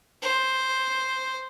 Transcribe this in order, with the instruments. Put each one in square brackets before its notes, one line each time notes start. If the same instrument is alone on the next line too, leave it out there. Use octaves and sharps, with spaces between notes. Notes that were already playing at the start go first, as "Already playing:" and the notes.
[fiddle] C5